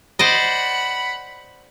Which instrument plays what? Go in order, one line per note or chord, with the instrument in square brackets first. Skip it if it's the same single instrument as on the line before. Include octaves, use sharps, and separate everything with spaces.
[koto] C5 D5 D#5 [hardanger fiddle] F#5 B5